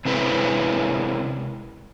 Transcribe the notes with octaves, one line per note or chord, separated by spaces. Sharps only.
C3 G#3 C4 C#4 E4 B4